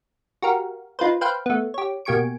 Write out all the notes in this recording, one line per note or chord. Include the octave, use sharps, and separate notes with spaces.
F#4 G4 A#4 F5
D#4 F4 B4 C5
B4 C5 F5 G5
A3 B3
G4 C#5
B2 A#3 G4 G#5 C#6 D7